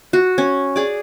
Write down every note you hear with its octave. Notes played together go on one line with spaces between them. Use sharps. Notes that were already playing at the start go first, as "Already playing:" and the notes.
F#4
C#4
G#4 D5